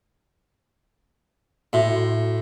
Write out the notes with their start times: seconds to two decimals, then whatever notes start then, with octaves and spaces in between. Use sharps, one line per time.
1.73 A2 F#4 E5 C6